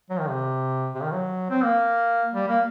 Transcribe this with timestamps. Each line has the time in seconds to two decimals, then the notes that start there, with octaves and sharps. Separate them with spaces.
0.10 F#3
0.19 D#3
0.30 C3
0.95 C3
1.03 D#3
1.13 F#3
1.50 C4
1.64 A#3
2.35 G3
2.48 A#3